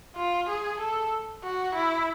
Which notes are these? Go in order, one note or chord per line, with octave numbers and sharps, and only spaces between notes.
F4
G#4
A4
F#4
E4